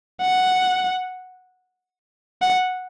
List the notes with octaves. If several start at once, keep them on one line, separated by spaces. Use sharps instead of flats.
F#5
F#5